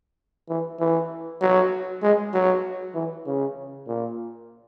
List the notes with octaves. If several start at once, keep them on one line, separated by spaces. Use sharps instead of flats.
E3
E3
F#3
G#3
F#3
E3
C#3
A#2